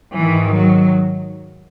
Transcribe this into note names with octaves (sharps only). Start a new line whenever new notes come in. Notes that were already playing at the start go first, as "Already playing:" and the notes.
G#2 D#3 E3
F#3